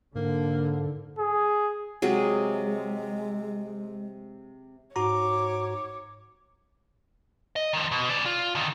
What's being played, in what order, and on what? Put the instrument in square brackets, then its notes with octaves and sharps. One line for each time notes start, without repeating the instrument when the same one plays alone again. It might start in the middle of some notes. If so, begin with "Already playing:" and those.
[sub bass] G#2 [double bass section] D3 [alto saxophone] A#3
[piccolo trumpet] G#4
[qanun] C3 F#3 G#4 [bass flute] G#3
[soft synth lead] G#2 [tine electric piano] F#4 A#5 [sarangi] C#5 [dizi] D6
[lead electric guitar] D#5
D#3 F3
B2
C#3 D5
F4
D3 D#3